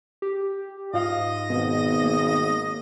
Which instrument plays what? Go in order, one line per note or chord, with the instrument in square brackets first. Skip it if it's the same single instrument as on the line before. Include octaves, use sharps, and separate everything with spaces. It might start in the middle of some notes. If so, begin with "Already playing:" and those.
[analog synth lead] G4
[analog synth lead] G#2 [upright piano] F4 F5 [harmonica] D#5
[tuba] G#1 [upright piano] B2
[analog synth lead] A#3